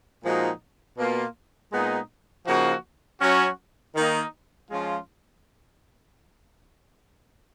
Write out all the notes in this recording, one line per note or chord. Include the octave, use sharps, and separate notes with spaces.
A#2 F3 G#3 D#4 F#4
B2 A#3 F4
A#2 G#3 B3 D#4
C#3 F3 A#3 D#4 F#4
F#3 C#4 F#4
D#3 A#3 D#4
F3 G#3 C#4 F4